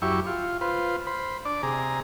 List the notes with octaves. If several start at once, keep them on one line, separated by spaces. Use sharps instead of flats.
F#2 E4 G4 C#6
F4
F4 B4 C5
C5 B5
D4 D5
C3 G#4 A#5